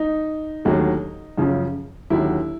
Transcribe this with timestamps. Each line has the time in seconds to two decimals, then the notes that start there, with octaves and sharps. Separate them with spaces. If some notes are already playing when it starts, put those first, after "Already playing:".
Already playing: D#4
0.65 D#2 D3 F#3 A3
1.38 F#2 C#3 F3
2.10 D#2 D3 F#3 E4